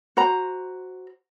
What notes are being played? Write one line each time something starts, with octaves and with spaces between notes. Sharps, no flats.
F#4 C5 A#5